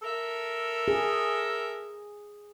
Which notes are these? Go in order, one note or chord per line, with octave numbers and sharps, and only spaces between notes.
A4 A#4 E5
G#4